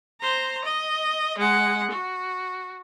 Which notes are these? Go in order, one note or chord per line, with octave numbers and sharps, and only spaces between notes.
C5 A#5
D#5
G#3 F#5
F#4